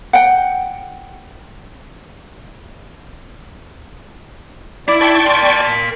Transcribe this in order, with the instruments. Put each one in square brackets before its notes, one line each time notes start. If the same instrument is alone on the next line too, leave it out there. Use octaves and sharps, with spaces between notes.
[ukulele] F#5 G5
[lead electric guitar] E4 [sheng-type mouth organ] D5
[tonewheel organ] D5 G5 C#6 [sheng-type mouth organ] A5
[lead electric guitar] A#4 C6